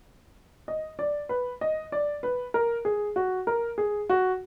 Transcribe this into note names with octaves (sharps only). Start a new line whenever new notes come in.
D#5
D5
B4
D#5
D5
B4
A#4
G#4
F#4
A#4
G#4
F#4